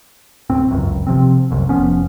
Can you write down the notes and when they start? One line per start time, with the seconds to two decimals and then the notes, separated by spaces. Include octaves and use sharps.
0.50 D1 A2 C4
0.71 G1 C#2 F#2
1.07 C3 F3 C4
1.50 F#1 C2 F#2
1.69 F1 F3 B3 C#4